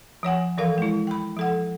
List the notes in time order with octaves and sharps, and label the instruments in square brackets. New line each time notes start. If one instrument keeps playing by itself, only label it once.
[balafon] F3 C#5 F#5 G#5
E3 F3 A4 A#4 F5
G#3 E4
G5 B5
F3 A4 F#5